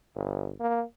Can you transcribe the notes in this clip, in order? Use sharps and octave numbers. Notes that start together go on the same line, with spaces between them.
G1
A#3